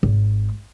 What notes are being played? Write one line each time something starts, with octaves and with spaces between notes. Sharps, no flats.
G#1